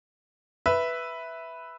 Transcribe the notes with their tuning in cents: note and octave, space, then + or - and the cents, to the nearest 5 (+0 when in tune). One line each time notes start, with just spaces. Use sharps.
B4 +0 E5 +0